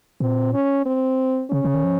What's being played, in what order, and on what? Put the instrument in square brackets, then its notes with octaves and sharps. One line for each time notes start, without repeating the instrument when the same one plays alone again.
[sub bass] A#2 [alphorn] C4
[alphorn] C#4
C4
[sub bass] C#3 [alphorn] C#4
[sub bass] C#3
D#3
F3